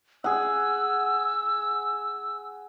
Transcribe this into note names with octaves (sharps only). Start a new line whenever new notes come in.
G#4 F#5 E6